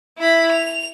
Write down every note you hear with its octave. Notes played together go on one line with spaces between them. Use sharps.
E4 B5
F7